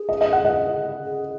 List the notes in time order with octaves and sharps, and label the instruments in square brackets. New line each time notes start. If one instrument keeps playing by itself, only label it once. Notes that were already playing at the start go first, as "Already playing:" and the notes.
Already playing: [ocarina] G#4
[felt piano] D#5
D#5
F#5
D#5
[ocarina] G#4